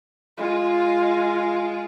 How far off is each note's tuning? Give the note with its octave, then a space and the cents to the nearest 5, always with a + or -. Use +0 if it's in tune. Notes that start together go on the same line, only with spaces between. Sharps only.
G#3 +0 F4 +0